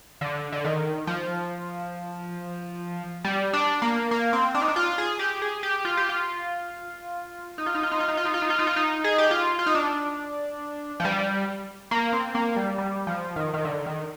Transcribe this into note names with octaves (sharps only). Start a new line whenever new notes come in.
D3
D3
D#3
F3
G3
D4
A#3
A#3
C4
D4
D#4
D4
F4
G#4
G4
G#4
G4
F4
G4
F4
D#4
F4
D#4
F4
D#4
F4
D#4
F4
D#4
F4
D#4
F4
D#4
F4
D#4
G#4
G4
F4
F4
D#4
D4
F3
G3
A#3
C4
A#3
G3
G3
F3
D#3
D#3
D3
D#3